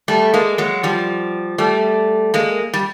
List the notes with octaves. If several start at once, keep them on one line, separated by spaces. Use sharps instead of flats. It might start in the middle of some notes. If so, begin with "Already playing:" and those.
G3 A3
G#3 A#3
F#3 G#3
F3 G3
G3 A3
G#3 A#3
G3